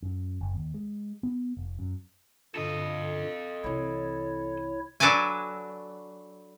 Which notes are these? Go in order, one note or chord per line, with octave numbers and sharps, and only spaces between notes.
F#2
F#1
D#2
G#3
B3
F1
F#2
G2 A#2 D3 A4 D#5
C2 E3 E4 C#5
F#3 D4 A4 B4 D5 G#5